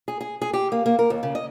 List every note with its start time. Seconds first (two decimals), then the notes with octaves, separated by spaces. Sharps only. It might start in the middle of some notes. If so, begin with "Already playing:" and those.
0.08 G#4
0.21 G#4
0.42 G#4
0.53 G4
0.72 A#3
0.86 A#3
0.99 A#4
1.10 D#2
1.23 C#3
1.35 D#5